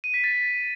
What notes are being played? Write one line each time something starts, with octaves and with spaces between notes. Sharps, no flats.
D#7
B6
A6